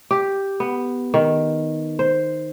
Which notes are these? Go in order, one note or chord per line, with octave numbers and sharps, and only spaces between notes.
G4
B3
D#3
C5